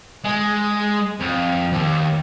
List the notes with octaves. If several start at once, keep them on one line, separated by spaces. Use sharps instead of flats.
G#3
F2
D#2